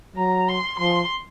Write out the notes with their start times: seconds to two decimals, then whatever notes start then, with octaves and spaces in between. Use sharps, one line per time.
0.16 F#3 A#5
0.48 C6
0.80 F3 C6